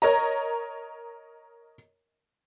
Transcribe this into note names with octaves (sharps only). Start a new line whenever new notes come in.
A#4 C#5 D#5 A#5